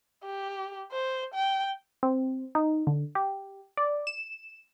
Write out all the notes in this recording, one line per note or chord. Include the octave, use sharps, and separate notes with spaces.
G4
C5
G5
C4
D#4
D3
G4
D5
E7